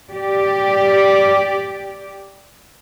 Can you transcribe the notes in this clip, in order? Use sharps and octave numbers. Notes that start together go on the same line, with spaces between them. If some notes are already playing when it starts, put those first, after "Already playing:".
G4 D5